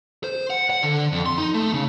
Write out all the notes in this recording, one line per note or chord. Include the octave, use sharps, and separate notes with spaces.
C5
F#5
F#5
D3
F2
C6
D#4
A3
C#3